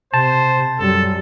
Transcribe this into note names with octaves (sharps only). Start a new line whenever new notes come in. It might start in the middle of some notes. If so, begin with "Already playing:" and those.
C3 C5 A5
F#2 G3 A4